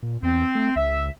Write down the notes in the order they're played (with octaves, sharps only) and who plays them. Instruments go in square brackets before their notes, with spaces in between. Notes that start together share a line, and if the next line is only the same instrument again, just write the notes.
[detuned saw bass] A#2
[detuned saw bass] E2 [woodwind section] C4
[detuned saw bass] A3
[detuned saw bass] C#2 [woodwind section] E5